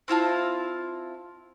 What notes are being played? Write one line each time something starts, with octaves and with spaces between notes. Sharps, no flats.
C4 E4 F4 A5